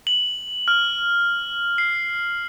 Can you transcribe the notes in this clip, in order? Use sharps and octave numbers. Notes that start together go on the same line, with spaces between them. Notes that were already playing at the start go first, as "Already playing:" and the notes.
F#7
F6
C7